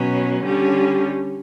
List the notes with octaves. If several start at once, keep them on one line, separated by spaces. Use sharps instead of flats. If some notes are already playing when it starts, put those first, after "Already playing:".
Already playing: B2 F#3 C#4
D3 G3 C#4